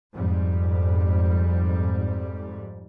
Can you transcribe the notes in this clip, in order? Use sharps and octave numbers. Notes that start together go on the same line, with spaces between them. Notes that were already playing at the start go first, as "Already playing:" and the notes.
F2 G#2 G3